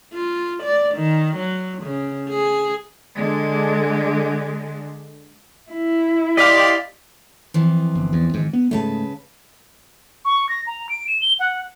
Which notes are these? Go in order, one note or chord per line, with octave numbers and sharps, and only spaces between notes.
F4
D5
D#3
F#3
C#3
G#4
D3 G#3
E4
G4 D5 D#5 F5 C6 B6
F2 E3 F3
G1
E2
G#2 D#3
B3
G#2 C#3 G#3 A3 B4 A5
C#6
A#6
A#5
D7
E7
G7
F#5